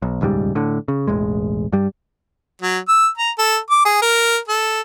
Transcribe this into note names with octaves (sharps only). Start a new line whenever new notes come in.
B1
D#1 C#2 G#2 G3
A2 D3
C#3
E1 A1 G#3
G2 G3
F#3
E6
A#5
A4
D6
G#4
A#4
A4